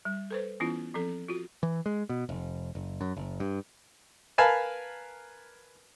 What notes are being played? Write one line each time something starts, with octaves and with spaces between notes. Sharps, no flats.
G3
A4 B4 C5
E3 B3 C#4 E4 F4
F3 C4 A4
F4 F#4
E3
G#3
B2
F1
F#1
F#2
F#1
G2
A#4 B4 F5 G#5 A5 B5